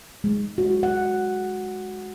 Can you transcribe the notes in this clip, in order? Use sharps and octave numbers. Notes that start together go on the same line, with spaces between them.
G#3
F#4
F#5